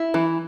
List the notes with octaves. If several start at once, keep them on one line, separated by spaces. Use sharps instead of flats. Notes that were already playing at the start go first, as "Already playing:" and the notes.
Already playing: E4
E3